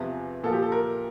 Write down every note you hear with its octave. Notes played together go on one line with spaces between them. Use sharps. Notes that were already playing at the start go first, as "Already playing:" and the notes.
Already playing: E2 C3 F3
A#2 F3 A4
G4
A4
A#4